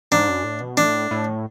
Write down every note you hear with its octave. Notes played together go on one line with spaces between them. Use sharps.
G#2 D4
F#2
A2
B2
A2 D4
A2